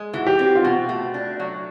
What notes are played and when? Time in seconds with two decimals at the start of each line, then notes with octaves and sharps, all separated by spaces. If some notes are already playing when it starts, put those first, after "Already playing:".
Already playing: G#3
0.14 E3 F#4
0.27 G4
0.39 C4
0.55 F4
0.64 B2 F#4
0.89 A3
1.14 D4
1.40 F#3